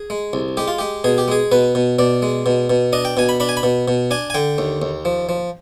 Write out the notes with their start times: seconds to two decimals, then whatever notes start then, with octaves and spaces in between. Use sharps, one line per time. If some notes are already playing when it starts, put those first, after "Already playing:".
Already playing: G#4
0.10 G#3
0.33 C2
0.57 G#3 G4
0.68 F4
0.79 G#3 G4
1.04 B2 G#4
1.18 G4
1.28 G#3 G#4
1.52 B2 B4
1.75 B2
1.99 B2 D5
2.22 G#3
2.46 B2
2.70 B2
2.93 D4 D#5
3.05 G5
3.17 B2 G#5
3.29 B5
3.40 D4 B5
3.49 G#5
3.57 B5
3.63 B2
3.88 B2
4.11 D4 G#5
4.30 G#5
4.34 D3 G5
4.58 D#2
4.82 D#2
5.05 F3
5.29 F3